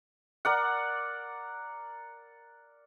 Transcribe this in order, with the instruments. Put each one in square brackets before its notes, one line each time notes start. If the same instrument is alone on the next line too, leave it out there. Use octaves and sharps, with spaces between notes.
[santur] A#4 D5 F#5